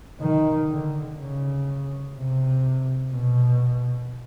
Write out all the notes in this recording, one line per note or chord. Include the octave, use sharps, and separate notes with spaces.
D#3
D3
C#3
C3
B2